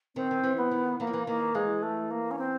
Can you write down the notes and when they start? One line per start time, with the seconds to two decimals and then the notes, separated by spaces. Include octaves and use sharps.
0.15 D#3 C4
0.31 D#3
0.43 E3
0.57 B3
0.71 D#3
1.00 E3 A#3
1.07 F3
1.13 E3
1.27 D#3 A#3
1.55 E3 G#3
1.83 A3
2.11 A#3
2.31 C#4
2.39 C4